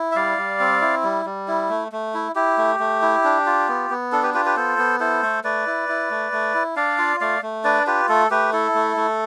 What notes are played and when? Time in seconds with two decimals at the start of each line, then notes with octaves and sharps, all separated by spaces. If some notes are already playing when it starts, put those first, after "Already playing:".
Already playing: E4
0.12 E5
0.16 G3 D5 F5
0.38 G3
0.60 C4
0.81 E4
1.03 G3
1.26 G3
1.48 E4
1.70 A3
1.92 A3
2.14 E4
2.35 E4 G4
2.58 A3
2.80 A3
3.02 E4
3.24 D4
3.46 F4
3.68 B3
3.90 B3
4.12 D4 A4
4.23 G4 B4
4.34 F4 G4 B4
4.45 G4 B4
4.56 B3 A4 C5
4.78 B3
5.00 E4 A4 C5
5.22 A3
5.44 A3 B4 D5
5.67 E4
5.89 E4
6.10 A3
6.32 A3
6.54 E4
6.76 D4 D5 F5
6.98 F4
7.21 A3 D5 F5
7.42 A3
7.64 D4 B4 D5
7.87 F4 G4 B4
8.09 A3 A4
8.30 A3 G4 B4
8.53 E4 A4
8.75 A3
8.97 A3